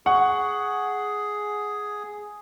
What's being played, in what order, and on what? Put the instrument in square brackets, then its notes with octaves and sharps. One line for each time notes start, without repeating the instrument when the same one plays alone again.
[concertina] G#4 [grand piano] F#5 C#6